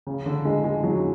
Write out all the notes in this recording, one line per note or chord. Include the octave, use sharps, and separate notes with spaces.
C#3
D3
G#3
G#3
F#3